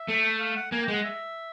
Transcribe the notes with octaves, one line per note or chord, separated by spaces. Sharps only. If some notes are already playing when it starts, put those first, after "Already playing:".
Already playing: E5
A3
F5
F#5
A#3 G#5
G5
G#3 F#5
E5